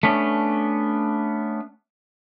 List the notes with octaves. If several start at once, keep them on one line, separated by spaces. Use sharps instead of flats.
A3 B3 C#4 D4